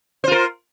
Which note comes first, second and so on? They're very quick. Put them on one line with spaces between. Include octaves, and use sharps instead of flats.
C5 F4 A#4